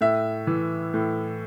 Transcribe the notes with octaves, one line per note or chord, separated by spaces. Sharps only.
A2 E5
E3
A2